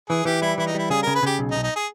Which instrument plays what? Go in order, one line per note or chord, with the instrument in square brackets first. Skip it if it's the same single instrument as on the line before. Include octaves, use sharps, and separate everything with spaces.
[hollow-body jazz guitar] E3 [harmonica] G#4
[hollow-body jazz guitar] E3 [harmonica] G4
[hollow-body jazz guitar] G3 [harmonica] E4
[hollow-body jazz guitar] E3 [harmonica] E4
[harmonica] D#4
[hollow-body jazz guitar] G3 [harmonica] E4
[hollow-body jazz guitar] C#3 [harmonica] G#4
[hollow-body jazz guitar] C#3 [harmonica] A#4
[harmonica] B4
[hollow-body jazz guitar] C#3 [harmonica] G4
[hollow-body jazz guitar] B1
[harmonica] D#4
[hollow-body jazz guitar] B1
[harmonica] D#4
G#4